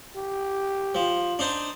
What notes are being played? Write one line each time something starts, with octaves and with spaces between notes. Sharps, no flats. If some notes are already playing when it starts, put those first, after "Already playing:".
G4
F3
D4 D#4 C5